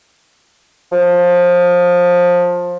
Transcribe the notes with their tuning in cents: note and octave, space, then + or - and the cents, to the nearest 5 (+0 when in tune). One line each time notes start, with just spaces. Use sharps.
F3 +20